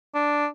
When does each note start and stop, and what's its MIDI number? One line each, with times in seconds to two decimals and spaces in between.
0.15 0.47 62